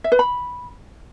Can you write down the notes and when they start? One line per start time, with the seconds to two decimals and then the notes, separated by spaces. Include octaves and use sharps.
0.04 E5
0.12 B4
0.19 B5